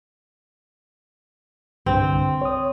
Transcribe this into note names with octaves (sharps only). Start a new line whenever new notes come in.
C2 G2 D3 C4
C#5 D#6